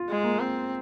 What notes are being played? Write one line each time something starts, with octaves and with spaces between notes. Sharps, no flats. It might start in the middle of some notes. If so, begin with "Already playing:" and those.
Already playing: F4
G#3
A#3
C4